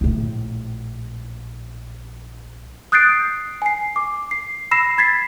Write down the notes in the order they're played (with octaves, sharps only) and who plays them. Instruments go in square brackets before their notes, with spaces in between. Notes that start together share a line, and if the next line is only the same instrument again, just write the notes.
[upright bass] A#1 A2
[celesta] D#6 F#6 G6 A6 C7 D7
G#5 C7
D6
C7
B5 E6 A#6 C7 E7
B5 G#6 A6 B6 C7